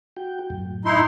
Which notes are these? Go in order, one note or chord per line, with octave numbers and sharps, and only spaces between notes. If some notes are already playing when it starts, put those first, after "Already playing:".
F#4 G5
F#2 A2
D#4 E4 C6